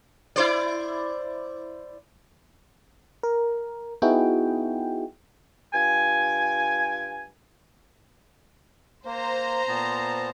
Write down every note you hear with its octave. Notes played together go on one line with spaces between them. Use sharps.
E4 C5 D5
A#4
B3 D#4 E4 F#4 G#4 G5
G2 F4 G5 G#5
A#3 C5 A#5
A#2 B3 A5